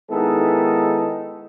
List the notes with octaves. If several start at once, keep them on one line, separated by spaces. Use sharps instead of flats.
D#3 G#3 B3 D#4 E4 A4